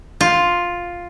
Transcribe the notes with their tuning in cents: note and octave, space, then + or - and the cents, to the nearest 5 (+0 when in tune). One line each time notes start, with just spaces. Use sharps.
F4 +5